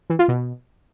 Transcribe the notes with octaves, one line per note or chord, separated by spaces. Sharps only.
E3
F4
B2